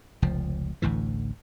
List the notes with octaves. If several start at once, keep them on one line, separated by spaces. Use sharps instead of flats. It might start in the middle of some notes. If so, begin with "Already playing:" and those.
F1 C#2 F3
A1 D2 A2 E3